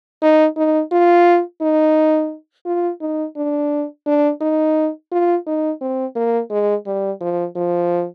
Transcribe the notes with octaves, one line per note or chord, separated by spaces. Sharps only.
D#4
D#4
F4
D#4
F4
D#4
D4
D4
D#4
F4
D#4
C4
A#3
G#3
G3
F3
F3